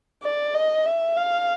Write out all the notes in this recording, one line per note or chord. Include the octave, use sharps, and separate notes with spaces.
D5
D#5
E5
F5